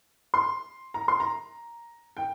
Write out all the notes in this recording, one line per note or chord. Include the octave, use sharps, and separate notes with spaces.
C6
A#5
C6
A#5
G5